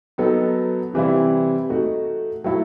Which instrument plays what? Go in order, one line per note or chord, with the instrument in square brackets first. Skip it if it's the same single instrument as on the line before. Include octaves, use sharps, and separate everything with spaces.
[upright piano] F#3 B3 D#4 A4
C3 E3 G3 C4 E4
A3 D#4 F#4
F#3 A3 E4 A4